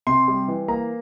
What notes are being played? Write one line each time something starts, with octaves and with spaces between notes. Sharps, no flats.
C3 C6
G3
E3
A#3 A#5